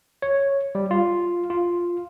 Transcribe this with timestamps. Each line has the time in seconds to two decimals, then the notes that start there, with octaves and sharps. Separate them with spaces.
0.22 C#5
0.75 G3
0.91 F4
1.50 F4